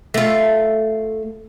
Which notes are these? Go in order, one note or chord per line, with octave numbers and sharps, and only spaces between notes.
A3 F4